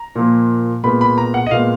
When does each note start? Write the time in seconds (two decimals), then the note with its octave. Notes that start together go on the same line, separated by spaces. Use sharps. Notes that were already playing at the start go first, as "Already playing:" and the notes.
Already playing: A#5
0.15 A#2 F3 A#3
0.84 A#2 G#3 B3 B5
1.01 B5
1.18 A#5
1.34 F#5
1.46 D#5
1.51 A#2 G#3 B3 F5